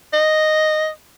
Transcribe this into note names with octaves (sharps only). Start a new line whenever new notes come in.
D#5